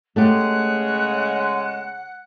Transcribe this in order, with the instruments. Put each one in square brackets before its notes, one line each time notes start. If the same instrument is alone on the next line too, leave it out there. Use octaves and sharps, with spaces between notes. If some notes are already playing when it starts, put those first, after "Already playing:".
[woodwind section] C#3 G#3 [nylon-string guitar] A3 B3 G4 [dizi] F#5